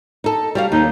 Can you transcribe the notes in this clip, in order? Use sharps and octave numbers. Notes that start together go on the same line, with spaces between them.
D#4 A4
G3 F#4 F5
D#2 D#4